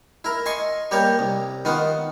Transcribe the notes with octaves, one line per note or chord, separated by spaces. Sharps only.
E4 A#4
D#5 G#5 C6 C#6
G3 A#3 G4 A#4 C#5
C2
D#3 B3 F4 F#5